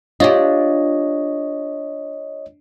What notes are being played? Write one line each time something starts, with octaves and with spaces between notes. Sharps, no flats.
D4 F4 G4 C#5 D#5